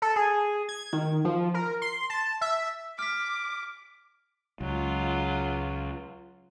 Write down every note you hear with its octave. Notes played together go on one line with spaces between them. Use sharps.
A4
G#4
G#6
D#3
F3
A#4
C6
A5
E5
D6 F6 B6
C#2 F#3 F4